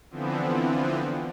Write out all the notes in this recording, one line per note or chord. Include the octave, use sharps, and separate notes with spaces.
D3 E3 F3 B3 C4